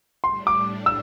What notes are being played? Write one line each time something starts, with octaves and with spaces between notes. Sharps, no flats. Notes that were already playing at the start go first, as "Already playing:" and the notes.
A2 G3 D4 C6
D6
E6